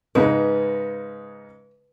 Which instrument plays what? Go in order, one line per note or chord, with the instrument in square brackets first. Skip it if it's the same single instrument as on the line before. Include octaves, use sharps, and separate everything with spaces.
[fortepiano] G#2 C#3 G#3 [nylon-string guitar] B4